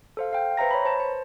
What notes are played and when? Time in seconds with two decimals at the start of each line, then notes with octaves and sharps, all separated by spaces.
0.17 A4 C5 F5
0.33 F5 G5
0.57 B4 C5 E5 A#5 A#6
0.71 C#5 B5
0.85 C5 A5
1.00 C5